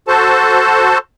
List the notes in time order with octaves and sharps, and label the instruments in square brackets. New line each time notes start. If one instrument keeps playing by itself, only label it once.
[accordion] F#4 A4 C5 A5